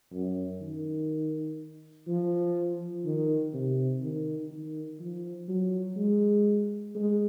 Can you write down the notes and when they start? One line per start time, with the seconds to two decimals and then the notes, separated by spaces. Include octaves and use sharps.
0.12 F#2
0.61 D#3
2.08 F3
3.05 D#3
3.53 C3
4.02 D#3
4.51 D#3
5.00 F3
5.48 F#3
5.97 G#3
6.95 G#3